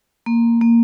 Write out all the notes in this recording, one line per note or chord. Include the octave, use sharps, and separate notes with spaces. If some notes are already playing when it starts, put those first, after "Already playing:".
A#3
A#3